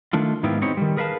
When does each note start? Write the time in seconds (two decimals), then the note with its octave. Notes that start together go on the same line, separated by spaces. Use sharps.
0.13 D#3 A3 D4 F4
0.43 G#2 D#3 B3 E4 F4 G4
0.61 B3 C4 D#4 G4 C#5
0.77 D#3 G3
0.97 G#4 A#4 B4 E5 F5 A5